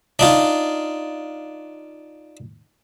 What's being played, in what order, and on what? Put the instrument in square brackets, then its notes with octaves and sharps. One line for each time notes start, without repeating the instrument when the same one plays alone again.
[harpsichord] D4 D#4 F4